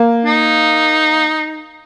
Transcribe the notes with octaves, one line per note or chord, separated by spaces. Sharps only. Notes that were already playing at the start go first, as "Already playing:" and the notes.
Already playing: A#3
D#4